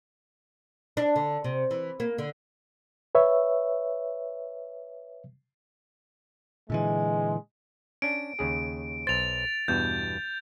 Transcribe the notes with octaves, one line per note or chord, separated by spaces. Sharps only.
D4
D3
C3
E3
A#3
D3
B4 C#5 E5
A#2 D3 E3 G#3
C#4 D4 D7
D#2 C#3 G#4
B1 C5 A6 F7
E2 G2 B2 G6